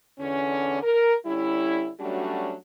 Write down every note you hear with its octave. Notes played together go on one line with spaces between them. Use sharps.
E2 D3 C#4
A#4
D3 G3 C#4 E4
F#3 G3 A3 C#4 D4 F#4